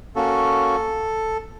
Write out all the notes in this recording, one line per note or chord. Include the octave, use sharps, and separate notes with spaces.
A#3 C#4 F#4 A4